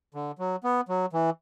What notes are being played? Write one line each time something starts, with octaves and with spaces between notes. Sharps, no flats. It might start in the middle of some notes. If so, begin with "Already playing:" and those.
D3
F#3
B3
F#3
E3